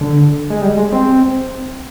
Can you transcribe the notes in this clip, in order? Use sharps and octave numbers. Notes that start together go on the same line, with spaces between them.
D3
G#3
G3
G#3
C4